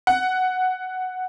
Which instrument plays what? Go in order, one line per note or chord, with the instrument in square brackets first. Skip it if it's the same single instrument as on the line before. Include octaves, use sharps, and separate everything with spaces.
[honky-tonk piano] F#5